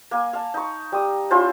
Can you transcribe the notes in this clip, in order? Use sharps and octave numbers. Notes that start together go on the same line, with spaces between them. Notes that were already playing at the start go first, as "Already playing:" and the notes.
A#3 G#5
F5 A5
D#4 C#6
G3 D#6
C#4 E4 F4 C5